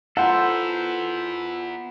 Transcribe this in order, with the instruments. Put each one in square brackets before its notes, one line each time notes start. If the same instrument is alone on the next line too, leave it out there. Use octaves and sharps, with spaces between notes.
[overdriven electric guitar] B3 E4 [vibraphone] F4 G#5 A#5 [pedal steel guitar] A4 C5 [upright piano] F#5